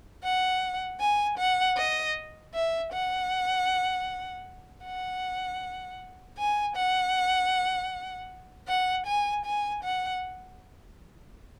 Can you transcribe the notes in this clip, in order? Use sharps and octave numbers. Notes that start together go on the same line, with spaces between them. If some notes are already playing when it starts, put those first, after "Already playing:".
F#5
G#5
F#5
D#5
E5
F#5
F#5
G#5
F#5
F#5
G#5
G#5
F#5